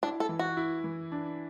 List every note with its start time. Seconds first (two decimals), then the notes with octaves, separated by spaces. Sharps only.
0.03 D4 E4
0.20 A4
0.29 E3
0.39 F#4
0.57 E4
0.84 E3
1.12 D4